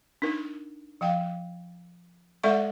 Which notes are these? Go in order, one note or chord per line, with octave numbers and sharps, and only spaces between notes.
D4 D#4 A#4
F3 F5 G5
G#3 A4 D5 E5 F#5 C#6